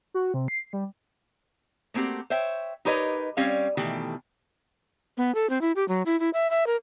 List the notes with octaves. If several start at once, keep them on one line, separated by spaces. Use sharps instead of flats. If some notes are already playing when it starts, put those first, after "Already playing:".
F#4
C3
C7
G3
A3 A#3 C4 F#4 G4
C5 C#5 E5 G5
D#4 G4 A#4 B4 C#5 D#5
G3 C4 C#4 C#5 F5
B2 D#3 E3 A3 G4
B3
A4
C4
E4
G4
F#3
E4
E4
E5
E5
A#4